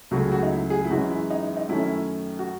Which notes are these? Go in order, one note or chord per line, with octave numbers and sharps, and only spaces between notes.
C#2 C#3 F#3 A3 C#4 F#4
F#4
D#4
E4
G#4
E4
F#2 E3 G#3 C#4 F#4
E4
D#4
D#4
D#4
F#2 D#3 A3 C#4 E4
F#4